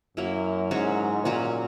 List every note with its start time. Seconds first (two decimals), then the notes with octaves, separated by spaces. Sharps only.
0.17 F#2 F#3 A#3 E4
0.71 G#2 F#3 C#4 F#4
1.24 A#2 F#3 C#4 F#4